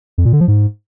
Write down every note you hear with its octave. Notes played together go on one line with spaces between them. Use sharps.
F2
A#2
D3
F3
G#2